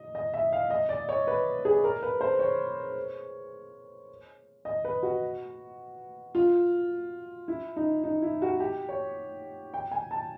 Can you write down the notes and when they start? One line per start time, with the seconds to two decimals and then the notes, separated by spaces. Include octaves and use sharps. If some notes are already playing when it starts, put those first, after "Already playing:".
Already playing: D#5
0.15 D#5
0.33 E5
0.52 F5
0.70 D#5
0.89 D5
1.09 C#5
1.27 B4
1.65 G#4
1.84 A#4
2.03 B4
2.21 C5
2.39 C#5
4.65 D#5
4.85 B4
5.03 F#4
6.35 F4
7.48 E4
7.76 D#4
8.04 D#4
8.22 E4
8.42 F#4
8.60 G4
8.89 C#5
9.74 G5
9.92 G#5
10.11 A5